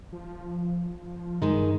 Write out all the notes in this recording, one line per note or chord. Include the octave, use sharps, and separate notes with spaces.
F3
G2 D#3 G#3 D#4